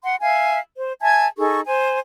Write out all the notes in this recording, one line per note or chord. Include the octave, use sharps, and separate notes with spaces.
F#5 C6
E5 F5 G#5
C5
E5 G#5 A5 G#6
D#4 G#4 A4 C#6
C5 G#5